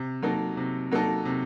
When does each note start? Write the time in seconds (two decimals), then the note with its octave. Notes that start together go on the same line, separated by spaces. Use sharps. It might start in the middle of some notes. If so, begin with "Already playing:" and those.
Already playing: C3
0.23 F#3 A#3 D#4 A4
0.57 C3
0.91 F#3 A#3 D#4 A4
1.25 C3